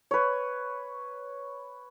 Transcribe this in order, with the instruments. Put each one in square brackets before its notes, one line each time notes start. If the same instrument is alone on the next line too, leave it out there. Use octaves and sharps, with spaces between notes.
[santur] B4 C#5